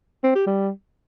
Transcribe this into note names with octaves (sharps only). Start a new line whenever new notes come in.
C4
G4
G3